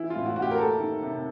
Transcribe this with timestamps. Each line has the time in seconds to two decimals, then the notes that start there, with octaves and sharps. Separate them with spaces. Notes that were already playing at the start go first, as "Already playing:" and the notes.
Already playing: E3 E4
0.10 F4
0.16 A2
0.26 F#4
0.36 A2 F#4
0.42 G4
0.51 A#4
0.58 A#3 A4
0.80 D#3
1.02 C3